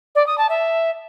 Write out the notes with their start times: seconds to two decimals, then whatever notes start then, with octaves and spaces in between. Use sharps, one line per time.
0.15 D5
0.26 D#6
0.38 A5
0.49 E5